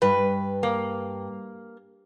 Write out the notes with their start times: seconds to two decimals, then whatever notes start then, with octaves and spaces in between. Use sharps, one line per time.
0.02 G2 B4
0.63 A#3